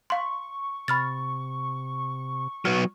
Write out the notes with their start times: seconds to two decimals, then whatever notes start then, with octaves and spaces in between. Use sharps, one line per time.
0.10 F5 C6 C#6
0.88 C3 B5 F6 A6
2.65 F#3 B3 F6